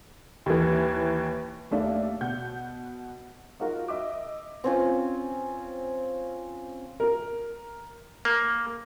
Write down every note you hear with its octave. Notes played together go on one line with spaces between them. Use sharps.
D#2 E3
D#2 A3 A#3 D4 E5
B2 F#5 G6
D#4 F4 F#4 A#4
D#5 E5 D6
C4 C#4 F4
A#4
A#3